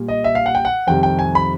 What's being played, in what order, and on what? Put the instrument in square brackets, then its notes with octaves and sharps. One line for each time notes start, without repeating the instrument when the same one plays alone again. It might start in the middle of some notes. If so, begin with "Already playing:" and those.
Already playing: [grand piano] A#2 G3
D#5
E5
F5
F#5
G5
F#5
F2 C3 D#3 G3 G5
G5
G#5
B5